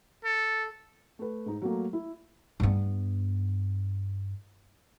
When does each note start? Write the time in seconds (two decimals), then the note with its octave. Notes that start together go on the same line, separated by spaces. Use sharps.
0.25 A4
1.19 A3 B4
1.46 G#2 D#4
1.62 F#3 A3 A#3
1.93 E4
2.60 G2 B3